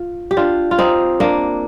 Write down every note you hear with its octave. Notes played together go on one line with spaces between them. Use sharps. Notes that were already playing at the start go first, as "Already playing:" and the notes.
Already playing: F4
G4
D4 F4
F4
C4 D#4
A#3 D4